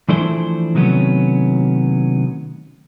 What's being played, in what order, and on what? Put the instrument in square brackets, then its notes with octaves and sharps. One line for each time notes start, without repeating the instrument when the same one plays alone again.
[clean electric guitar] E3 F3 A3 D4 E4 C5
C3 D#3 F#3 A3 B3 C#4